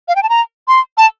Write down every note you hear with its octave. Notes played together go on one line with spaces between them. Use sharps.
F5
G5
A5
A#5
C6
A5